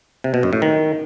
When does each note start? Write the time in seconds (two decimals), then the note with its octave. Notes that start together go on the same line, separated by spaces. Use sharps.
0.24 C3
0.34 B2
0.43 F#2
0.53 A2
0.62 D#3